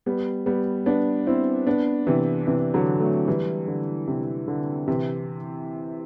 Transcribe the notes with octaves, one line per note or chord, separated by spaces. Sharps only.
G3 B3
G3 B3
B3 D4
C4 E4
B3 D4
C3 E3
C3 E3
D3 F#3
F#3 A3
E3 G3
D3
C3
D3
C3 E3